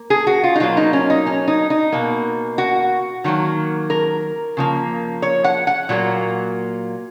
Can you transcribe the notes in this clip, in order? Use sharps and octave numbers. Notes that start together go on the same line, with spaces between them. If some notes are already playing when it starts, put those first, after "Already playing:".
Already playing: A#3
G#4
F#4
F4
D#4
B2 F#3 A#3 F4
D#4
C#4
D#4
C#4
D#4
D#4
B2 A#3
F#4
D#3 F#3 A#3
A#4
C#3 F3 A#3
C#5
F#5
F#5
A#2 F#3 A#3